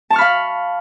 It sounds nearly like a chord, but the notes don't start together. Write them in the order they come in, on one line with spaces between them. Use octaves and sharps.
A5 C#6 F6 B5 F5